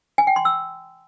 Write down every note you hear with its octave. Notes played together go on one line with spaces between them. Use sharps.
G#5
G5
C6
E6